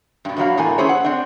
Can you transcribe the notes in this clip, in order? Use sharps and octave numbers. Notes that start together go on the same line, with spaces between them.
G2 B2
E2 B2 F#3 F5
E2 A2 A#3 G#5
C#4 E4 G4 G#4 C5 C#5
F#5
C4 D4